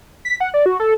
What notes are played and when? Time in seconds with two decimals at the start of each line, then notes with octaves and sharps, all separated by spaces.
0.25 B6
0.40 F#5
0.54 D5
0.66 F#4
0.80 A4